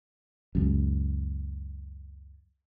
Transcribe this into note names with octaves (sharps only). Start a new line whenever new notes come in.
C#2 F#2